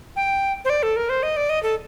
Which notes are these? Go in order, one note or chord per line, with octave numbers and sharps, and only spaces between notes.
G5
C5
D5
A4
A#4
C5
D#5
D5
D#5
A4